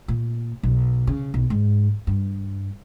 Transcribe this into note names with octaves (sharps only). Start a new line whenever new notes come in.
A#2
B1
C#3
B1
G#2
G2